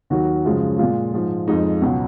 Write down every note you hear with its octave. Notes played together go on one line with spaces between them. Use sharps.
D#2 D#3 F#3 F#4
F#2 C#3 F3 G#3
A#2 G#3 F4
G#2 F3 G#3
F2 F3 G#3 D#4
C#2 B2 F#3